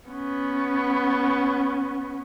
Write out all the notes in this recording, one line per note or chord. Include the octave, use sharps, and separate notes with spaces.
B3 C#4